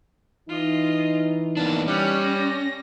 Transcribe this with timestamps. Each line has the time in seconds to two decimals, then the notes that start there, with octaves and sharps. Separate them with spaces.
0.49 E3 D#4 F4 D#5
1.57 A#3 B3 D4 A6
1.88 G3 C#4 F#5
2.25 A#6